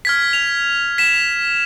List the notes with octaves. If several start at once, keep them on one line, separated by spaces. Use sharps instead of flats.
F6 G#6 B6
F7
B6 E7